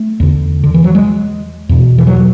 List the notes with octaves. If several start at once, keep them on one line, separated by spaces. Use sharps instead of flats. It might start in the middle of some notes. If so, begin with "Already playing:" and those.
Already playing: A3
E2 D3
D3
E3
F#3
G#3
E2 B2
E3
F#3